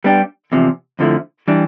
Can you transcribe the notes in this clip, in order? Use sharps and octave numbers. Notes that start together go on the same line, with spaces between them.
G3 B3 D4 G4
E2 C3 F3
F2 D3 F3 A3 E4
E3 G3 D4